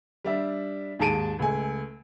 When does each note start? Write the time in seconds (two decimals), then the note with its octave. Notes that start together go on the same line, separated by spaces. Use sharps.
0.24 G3 D4 E5
0.99 D#2 G#2 G#4 A5 D7 D#7
1.39 C#2 A3 G#5